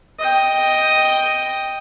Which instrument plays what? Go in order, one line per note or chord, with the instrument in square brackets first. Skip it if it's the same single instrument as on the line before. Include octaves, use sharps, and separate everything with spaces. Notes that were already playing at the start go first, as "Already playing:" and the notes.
[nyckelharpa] D#5 G5